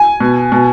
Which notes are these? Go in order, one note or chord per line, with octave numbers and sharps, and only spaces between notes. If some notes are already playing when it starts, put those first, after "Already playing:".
Already playing: G#5
B2
B2